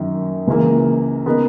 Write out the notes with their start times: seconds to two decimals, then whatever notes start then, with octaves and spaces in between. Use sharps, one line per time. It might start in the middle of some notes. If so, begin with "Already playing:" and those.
Already playing: F#2 D#3 D#4
0.47 C#2 C#3 E3 A#3
1.26 C#3 G#3 B3 D#4 A#4